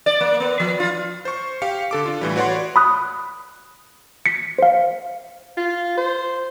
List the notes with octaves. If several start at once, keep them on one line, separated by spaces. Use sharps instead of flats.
D5
A#3
B3
F3
F4
C5 C#6
G4 F5 C#7
D3 A4 D6
D4 F4
A2 E3 G3
F#4 B4 C#5 D5 F#5 C6
B5 D#6 F#6
B6 C#7
C5 F5
F4
C5